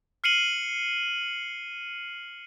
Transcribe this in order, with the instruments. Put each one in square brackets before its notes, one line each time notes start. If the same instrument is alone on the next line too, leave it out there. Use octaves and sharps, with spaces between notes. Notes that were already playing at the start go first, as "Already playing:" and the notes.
[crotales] F6 C7 C#7 D#7 F#7